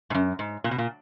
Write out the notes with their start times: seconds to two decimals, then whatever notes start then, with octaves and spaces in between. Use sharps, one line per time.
0.10 G#2
0.14 F#2
0.39 G#2
0.64 A#2
0.71 B2
0.78 A#2